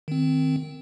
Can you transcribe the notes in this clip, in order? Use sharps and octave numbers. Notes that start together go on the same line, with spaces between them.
D#3 C4